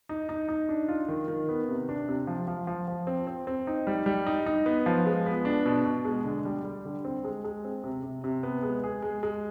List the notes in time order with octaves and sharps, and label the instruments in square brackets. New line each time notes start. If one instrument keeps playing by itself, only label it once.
[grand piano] D#4
D#4
D#4
D4
F4
D#3
D#3
B3
C3
D4
C3
F3
F3
F3
F3
C4
C4
C4
D#4
G3
G3
D#4
D#4
B3
F3
G#3
B3
D4
B2
B2
G#3
D3
G3
G3
D3
C4
G#3
G#3
C4
C3
C3
C3
B3
G#3
G#4
G#3
G#3